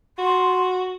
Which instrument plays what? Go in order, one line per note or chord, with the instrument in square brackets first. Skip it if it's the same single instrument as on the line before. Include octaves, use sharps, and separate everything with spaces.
[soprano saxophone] F#4 [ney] C6